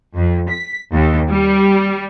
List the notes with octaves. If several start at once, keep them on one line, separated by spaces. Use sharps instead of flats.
F2
B6
D#2
G3